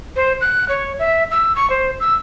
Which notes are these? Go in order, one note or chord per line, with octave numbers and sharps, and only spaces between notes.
C5
F#6
C#5
E5
E6
C#6
C5
E6